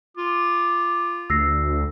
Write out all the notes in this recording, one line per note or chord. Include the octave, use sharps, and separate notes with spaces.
F4 D6
D2 E6 A#6 C7